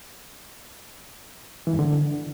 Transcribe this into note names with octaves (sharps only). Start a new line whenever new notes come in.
E3
G2
D3